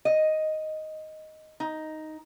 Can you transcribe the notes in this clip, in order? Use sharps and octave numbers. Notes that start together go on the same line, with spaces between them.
D#5
D#4